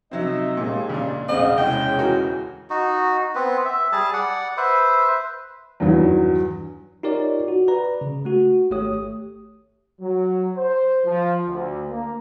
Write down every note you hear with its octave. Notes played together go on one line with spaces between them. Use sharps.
C3 F#3 C4 D#4 D#5 E5
D#2 A#2 G#3
C#3 D4
E1 D2 C#3 C4 D#5 F5 F#5
C2 G#3 C#4 G5
E3 F#4 A#4
D#4 F#4
B3 C4 B4
E5
G3 G#4 A5
D5 F#5
B4 C5 E5
E2 G2 D#3 F#3 F#4
D#4 F4 G4 A#4 C#5 D5
F#4
B4 D5 A#5
C#3
A3 F#4
G#1 A3 G4 C#5 D#6
F#3
C5
F3
D2
A#3